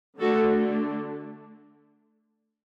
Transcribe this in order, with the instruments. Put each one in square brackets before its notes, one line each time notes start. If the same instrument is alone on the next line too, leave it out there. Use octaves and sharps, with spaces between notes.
[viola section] D3 A3 D4 F#4 A4